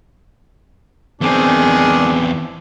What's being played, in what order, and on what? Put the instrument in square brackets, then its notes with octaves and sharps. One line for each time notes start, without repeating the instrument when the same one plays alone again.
[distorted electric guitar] E2 C4 [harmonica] D#3 D4 [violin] G#4